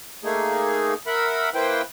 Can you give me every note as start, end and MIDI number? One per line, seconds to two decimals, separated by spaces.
0.24 0.94 57
0.24 0.94 58
0.24 0.94 63
0.24 0.94 68
1.07 1.50 70
1.07 1.50 76
1.07 1.50 78
1.07 1.50 83
1.54 1.82 58
1.54 1.82 64
1.54 1.82 71
1.54 1.82 72
1.54 1.82 79